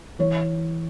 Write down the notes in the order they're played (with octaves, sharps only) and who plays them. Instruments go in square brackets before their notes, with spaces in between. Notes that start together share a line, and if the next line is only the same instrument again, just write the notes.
[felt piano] E3 C#5